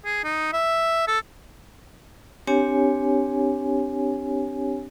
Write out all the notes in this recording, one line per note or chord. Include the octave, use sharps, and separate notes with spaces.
G#4
D#4
E5
A4
C4 D4 G4 C#5 G#5